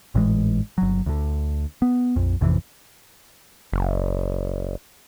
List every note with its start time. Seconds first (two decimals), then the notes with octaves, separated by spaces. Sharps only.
0.15 G#1 A2 E3 G#3
0.78 G1 F#3
1.06 D2 D3
1.82 B3
2.16 A#1 F2
2.41 A1 F2 C3 E3
3.72 F#1